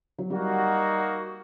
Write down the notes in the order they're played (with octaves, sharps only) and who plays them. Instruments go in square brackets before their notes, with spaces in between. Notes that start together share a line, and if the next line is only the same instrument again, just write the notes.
[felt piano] F#3
[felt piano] G3 [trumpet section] A#3 D#4 F#4